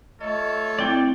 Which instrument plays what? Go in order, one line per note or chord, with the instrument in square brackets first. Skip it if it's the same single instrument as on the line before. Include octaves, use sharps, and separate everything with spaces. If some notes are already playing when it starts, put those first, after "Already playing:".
[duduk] A3 [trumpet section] F4 A4 C#5 [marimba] D#5
[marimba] A3 C4 E4 [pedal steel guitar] D5 G5